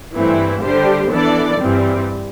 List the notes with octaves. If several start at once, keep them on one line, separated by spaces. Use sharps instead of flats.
G2 E3 A3 C4 E4
D3 G3 D4 G4 C5
E3 B3 D4 A4 D5
G2 E3 G3 C4